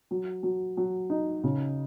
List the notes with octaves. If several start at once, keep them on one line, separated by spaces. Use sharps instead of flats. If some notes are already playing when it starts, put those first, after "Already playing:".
F#3
F#3
F#3
D#4
C#3